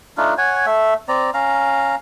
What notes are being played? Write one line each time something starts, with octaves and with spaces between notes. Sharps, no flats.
A3 D4 D#4 F4
C#5 F#5 G#5
A3 E5
C4 D5 A#5
C#4 F5 A#5